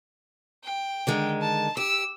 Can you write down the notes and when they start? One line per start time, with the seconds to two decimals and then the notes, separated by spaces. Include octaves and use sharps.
0.64 G5
1.07 D3 D#3 G#3
1.41 A5
1.77 G4 E6